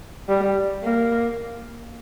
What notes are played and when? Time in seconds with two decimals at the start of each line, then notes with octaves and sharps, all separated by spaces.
0.29 G3
0.83 A#3